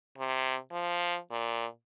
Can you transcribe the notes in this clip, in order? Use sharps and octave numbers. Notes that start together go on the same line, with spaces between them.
C3
F3
A#2